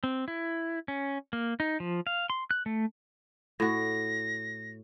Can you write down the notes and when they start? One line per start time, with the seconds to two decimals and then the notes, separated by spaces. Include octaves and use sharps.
0.04 C4
0.28 E4
0.88 C#4
1.33 A#3
1.60 D#4
1.80 F3
2.07 F5
2.30 C6
2.51 F#6
2.66 A3
3.60 A2 F#4 A#6